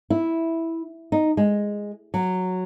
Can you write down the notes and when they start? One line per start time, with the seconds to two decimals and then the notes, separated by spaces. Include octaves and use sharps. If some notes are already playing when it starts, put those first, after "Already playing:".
0.10 E4
1.12 D#4
1.37 G#3
2.14 F#3